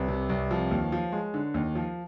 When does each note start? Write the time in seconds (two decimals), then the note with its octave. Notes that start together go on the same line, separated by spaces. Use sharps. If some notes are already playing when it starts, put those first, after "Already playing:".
Already playing: C2 B4 C#5
0.08 C3
0.29 C2
0.51 F3
0.71 D#2
0.92 F3
1.12 G#3
1.34 D3
1.54 D#2
1.75 F3